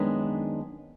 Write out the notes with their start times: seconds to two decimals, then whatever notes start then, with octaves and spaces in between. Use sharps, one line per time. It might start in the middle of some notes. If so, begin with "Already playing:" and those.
Already playing: F#2 D#3 G#3 B3 D4